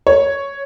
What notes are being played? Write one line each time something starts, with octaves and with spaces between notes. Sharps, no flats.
C#5